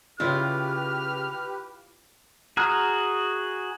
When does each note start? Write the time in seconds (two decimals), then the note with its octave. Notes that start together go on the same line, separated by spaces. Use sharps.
0.20 C#3 E4 F4 G4 B4 F6
2.57 F#4 G#4 A#5 F6